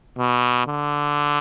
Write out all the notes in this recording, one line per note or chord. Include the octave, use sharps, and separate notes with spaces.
B2
D3